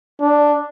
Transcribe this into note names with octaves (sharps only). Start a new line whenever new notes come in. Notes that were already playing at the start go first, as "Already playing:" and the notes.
D4